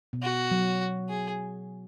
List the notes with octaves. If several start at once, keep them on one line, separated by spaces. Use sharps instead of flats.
B2
F#4
F#3
G#4